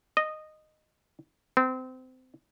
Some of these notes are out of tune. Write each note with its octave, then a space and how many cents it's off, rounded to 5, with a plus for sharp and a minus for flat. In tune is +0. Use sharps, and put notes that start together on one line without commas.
D#5 -10
C4 -25